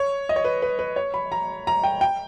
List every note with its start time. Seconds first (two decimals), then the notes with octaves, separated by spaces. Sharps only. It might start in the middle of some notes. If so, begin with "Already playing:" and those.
Already playing: C#5
0.29 D#5
0.36 C#5
0.45 B4
0.62 B4
0.79 B4
0.96 C#5
1.14 B5
1.32 A#5
1.67 A#5
1.84 G5
2.01 G5